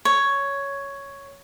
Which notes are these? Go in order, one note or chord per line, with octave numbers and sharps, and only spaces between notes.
C#5